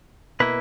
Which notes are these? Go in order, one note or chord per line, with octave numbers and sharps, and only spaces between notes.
B2 A#3 E4 B4